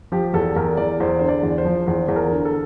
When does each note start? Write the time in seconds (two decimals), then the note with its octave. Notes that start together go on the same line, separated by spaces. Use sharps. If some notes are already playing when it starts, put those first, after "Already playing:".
0.12 F3 G4
0.34 E2 A4
0.56 E2 A#4
0.77 E2 D5
1.00 E2 C5
1.19 D3 C5
1.29 D5
1.43 E2
1.58 C5
1.65 F3
1.86 E2 C5
2.08 E2
2.16 A#4
2.31 D3
2.45 A4